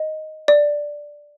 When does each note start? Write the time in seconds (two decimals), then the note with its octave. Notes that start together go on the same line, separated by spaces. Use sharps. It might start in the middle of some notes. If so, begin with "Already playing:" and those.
Already playing: D#5
0.48 D5